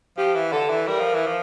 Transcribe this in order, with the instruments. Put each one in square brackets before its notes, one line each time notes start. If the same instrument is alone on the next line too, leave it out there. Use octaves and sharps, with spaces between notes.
[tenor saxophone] F3 [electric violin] G4
[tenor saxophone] E3
[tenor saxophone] D3 [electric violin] A4
[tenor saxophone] E3
[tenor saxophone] G3 [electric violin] A#4
[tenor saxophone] F3
E3
F3